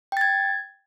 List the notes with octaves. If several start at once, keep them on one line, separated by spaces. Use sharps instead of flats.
G5 G#6 A6